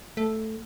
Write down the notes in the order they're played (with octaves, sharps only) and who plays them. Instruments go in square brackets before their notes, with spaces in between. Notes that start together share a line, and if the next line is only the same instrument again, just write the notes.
[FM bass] A3